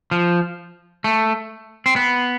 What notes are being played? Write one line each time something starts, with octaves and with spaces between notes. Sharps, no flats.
F3
A3
C4
B3